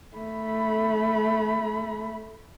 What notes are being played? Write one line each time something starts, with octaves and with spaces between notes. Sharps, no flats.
A3 B5